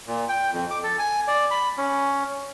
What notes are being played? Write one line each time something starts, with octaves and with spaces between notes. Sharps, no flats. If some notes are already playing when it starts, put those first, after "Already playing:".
A#2
G5
F2
D6
A4
G#5
D5
B5
C#4